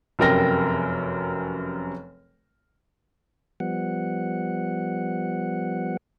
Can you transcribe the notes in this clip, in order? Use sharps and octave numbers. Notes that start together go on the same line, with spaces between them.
F1 F#2 C3 A#4 G5 A#6
F3 G3 B3 F#5